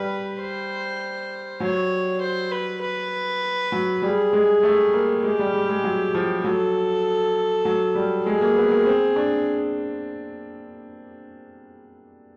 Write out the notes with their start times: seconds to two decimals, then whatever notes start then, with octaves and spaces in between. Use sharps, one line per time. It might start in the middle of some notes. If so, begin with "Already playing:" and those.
Already playing: G3 B4
0.40 C5
1.60 F#3 C#5
2.21 C5
2.51 B4
2.81 B4
3.72 F#3
4.02 G3 G#4
4.33 G#3
4.63 A3
4.93 A#3
5.23 G#3 G4
5.39 G3
5.54 G3
5.69 G#3
5.84 F#3
6.14 F3
6.44 F#3 A4
7.65 F#3
7.95 G3
8.25 G#3 G#4
8.41 A#3
8.56 B3
8.71 A#3
8.86 C4
9.16 D4